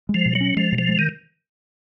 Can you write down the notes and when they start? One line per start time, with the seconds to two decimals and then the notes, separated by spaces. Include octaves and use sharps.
0.09 G#3
0.14 F3
0.26 B2
0.35 F#3
0.41 C#4
0.57 F3 G#3
0.72 B2
0.78 F3
0.89 G#3
0.99 D#3